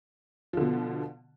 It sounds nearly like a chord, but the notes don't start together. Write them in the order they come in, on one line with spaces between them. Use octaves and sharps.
F3 D3 B2